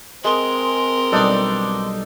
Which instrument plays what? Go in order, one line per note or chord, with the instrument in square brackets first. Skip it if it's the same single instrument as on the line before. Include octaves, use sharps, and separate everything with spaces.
[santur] G#3 [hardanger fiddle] C4 A#4 [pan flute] C6
[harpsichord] B1 G3 D5 [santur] D4 D#4 A4